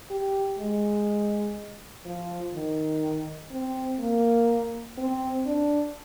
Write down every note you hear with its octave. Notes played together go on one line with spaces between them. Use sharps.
G4
G#3
F3
D#3
C4
A#3
C4
D4